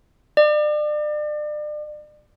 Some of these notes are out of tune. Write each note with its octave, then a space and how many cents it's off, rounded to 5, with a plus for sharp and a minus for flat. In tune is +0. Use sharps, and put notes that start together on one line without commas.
D5 +35